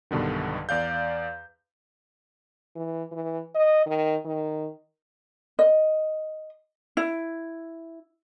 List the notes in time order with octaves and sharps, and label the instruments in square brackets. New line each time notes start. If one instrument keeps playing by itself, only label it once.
[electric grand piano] B1 G2 B2 D3 D#3
E2 D5 F5 G6
[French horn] E3
E3
D#5
D#3
D#3
[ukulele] D#5
E4